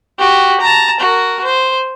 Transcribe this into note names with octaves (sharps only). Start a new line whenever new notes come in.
F#4 G4
A5 A#5
F#4 A#4
C5